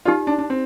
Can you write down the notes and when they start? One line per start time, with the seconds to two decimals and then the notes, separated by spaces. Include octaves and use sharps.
0.05 D#4 F4 G4 D5
0.27 D4
0.39 D4
0.50 C4